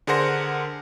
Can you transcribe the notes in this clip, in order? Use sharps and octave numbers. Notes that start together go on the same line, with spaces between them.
D3 G#4 A#4 C5 F#5 A#6